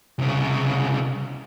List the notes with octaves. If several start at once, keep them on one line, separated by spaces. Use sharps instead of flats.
C2 C#3